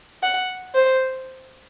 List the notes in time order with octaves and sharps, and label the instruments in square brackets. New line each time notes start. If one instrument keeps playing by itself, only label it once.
[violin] F#5
C5